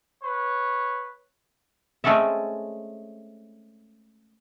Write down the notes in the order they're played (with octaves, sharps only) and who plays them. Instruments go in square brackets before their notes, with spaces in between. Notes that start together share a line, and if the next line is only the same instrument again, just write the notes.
[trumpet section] B4 C#5
[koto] G#3 A3 C4 C#4 A4 E5